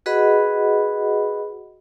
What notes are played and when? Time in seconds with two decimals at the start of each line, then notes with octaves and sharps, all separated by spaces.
0.06 F#4 G#4 B4 D#5 F#5 B5